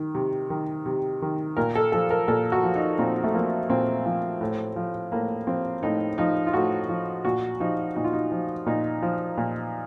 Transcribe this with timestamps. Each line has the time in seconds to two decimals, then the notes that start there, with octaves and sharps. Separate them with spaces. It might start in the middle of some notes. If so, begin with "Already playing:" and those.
Already playing: D#3
0.15 C3
0.50 D#3
0.86 C3
1.22 D#3
1.57 A#2 A#4
1.75 A4
1.92 F3 A4
2.10 A#4
2.28 A#2 A4
2.52 F#4
2.63 F3
2.76 D#4
2.99 A#2 C4
3.24 A3
3.34 F3 A#3
3.70 A#2 C4
4.06 F3
4.41 A2
4.76 F3
5.12 A2 A#3
5.47 F3 C4
5.83 A2 D#4
6.18 F3 D#4
6.47 F4
6.54 A2 F#4
6.89 F3
7.25 A#2 F#4
7.60 F3 D#4
7.96 A#2 D#4
8.04 F4
8.13 D#4
8.32 F3
8.66 A#2 D#4
9.02 F3
9.38 A#2